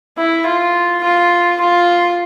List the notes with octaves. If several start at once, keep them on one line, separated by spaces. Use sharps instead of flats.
E4
F4
F4
F4